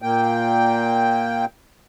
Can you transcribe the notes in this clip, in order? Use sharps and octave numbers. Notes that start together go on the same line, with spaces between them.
A#2 A#3 G5